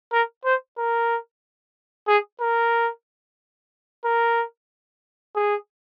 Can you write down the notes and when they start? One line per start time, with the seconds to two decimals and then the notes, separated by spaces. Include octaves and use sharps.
0.13 A#4
0.45 C5
0.78 A#4
2.08 G#4
2.41 A#4
4.05 A#4
5.36 G#4